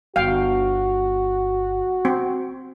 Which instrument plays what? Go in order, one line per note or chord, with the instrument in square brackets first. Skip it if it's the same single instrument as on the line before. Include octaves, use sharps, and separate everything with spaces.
[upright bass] G1 [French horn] F#4 [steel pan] F5 G5
[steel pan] C4